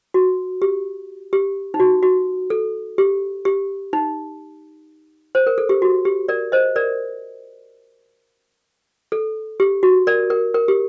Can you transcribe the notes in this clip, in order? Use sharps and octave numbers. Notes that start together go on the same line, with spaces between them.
F#4
G4
G4
D#4
F#4
F#4
A4
G4
G4
D#4
C5
A#4
A4
G4
F#4
G4
A#4 D5
C5 D#5
A#4 D5
A4
G4
F#4
A#4 D5
A#4
A#4
G4